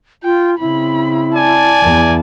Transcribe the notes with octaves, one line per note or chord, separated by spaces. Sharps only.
F4 G5
C#3 C4 E4 B5
D5 G#5 A5
E2 E3